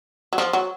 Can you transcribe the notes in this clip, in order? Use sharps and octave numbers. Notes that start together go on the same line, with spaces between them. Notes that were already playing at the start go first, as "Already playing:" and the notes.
F#3
F3
F#3